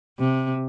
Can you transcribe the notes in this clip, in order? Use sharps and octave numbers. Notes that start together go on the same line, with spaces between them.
C3